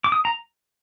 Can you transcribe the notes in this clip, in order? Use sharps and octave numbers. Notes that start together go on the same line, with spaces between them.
D6
D#6
A#5